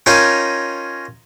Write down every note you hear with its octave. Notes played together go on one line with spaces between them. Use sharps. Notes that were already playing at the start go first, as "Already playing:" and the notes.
C#4 D#4 F4 A#4 G5 G#5